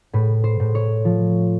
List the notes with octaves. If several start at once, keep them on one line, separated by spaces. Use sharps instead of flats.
A2 B4
C5
A2
C#5
F3